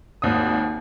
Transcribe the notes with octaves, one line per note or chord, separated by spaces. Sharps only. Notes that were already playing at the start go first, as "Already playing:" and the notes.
G#1 D#2 D#6